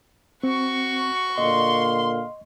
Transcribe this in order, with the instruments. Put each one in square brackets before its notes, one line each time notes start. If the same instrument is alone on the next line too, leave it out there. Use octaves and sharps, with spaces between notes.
[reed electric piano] C4 [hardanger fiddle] F#4 C#6
[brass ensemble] A#2 D3 F5 [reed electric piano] D#5 [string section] C6